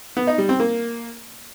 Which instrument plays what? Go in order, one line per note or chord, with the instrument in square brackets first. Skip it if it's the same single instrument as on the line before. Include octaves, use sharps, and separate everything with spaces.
[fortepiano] B3
D#4
G3
C4
A#3